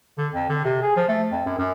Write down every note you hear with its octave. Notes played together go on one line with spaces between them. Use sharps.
D3
F2
D3
C3
G#4
F3
A3
F2
F#2
F#2